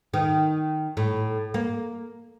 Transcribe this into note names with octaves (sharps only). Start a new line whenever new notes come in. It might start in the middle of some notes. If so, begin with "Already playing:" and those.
D#3
A2
A#3